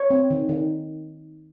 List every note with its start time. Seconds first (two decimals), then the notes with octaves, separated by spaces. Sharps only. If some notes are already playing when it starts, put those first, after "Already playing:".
Already playing: C#5
0.10 C4
0.30 D#3
0.49 D#3